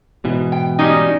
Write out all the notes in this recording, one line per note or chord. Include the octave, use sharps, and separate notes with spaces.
G#2 B2 E3
G5
G3 C#4 D#4